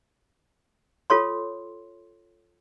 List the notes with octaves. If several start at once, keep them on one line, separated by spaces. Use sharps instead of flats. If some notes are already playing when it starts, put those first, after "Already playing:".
F4 A4 C#5 C6